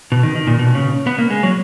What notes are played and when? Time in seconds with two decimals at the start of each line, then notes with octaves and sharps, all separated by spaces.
0.12 B2
0.23 D#3
0.36 D#3
0.47 A#2
0.59 B2
0.75 C#3
1.07 B3
1.18 A#3
1.30 G#3
1.43 F#3